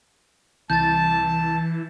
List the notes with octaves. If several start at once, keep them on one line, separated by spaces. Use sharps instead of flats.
C2 E3 A5 G6 A6